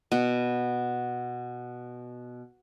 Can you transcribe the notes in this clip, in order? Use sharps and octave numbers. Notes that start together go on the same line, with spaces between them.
B2 B3